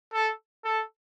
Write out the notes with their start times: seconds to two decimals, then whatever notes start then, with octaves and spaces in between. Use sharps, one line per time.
0.14 A4
0.65 A4